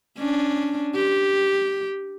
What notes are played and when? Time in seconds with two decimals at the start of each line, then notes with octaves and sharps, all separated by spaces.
0.18 C#4 D4
0.95 G4